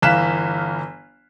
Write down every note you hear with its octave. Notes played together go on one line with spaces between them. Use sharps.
G1 E3 F5 F#6 B6 E7